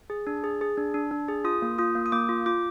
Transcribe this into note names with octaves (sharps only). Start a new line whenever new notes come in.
G#4
D4
G#4
G#4
D4
D4
D4
G#4
F4 D#6
A#3
F4 D#6
A#3
D#6
A#3 D6
F4
F4 D6